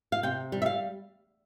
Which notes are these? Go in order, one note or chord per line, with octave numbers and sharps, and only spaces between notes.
F5
C3 G5
G3
E5
F5